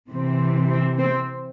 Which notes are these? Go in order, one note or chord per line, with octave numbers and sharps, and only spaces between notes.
C3 E3 C4
C4
C4